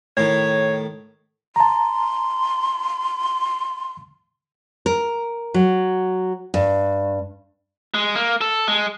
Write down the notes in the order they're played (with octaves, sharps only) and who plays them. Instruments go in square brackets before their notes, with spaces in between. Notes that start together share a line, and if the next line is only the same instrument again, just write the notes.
[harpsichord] A2 D#3 [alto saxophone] C#5
[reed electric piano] A5 A#5 [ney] C6
[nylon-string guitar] A#4
F#3
G2
[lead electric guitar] G#3
A#3
A4
G#3